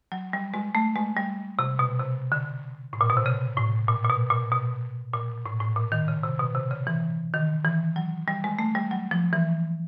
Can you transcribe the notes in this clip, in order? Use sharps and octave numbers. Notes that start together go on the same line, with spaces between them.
F#3
G3
G#3
A3
G#3
G3
C3
B2
C3
D3
A2
A#2
B2
C3
C#3
A2
A#2
A#2
B2
A#2
B2
A#2
A2
A2
A#2
D#3
C#3
C3
B2
C3
C#3
E3
D#3
E3
F#3
G3
G#3
A3
G3
F#3
F3
E3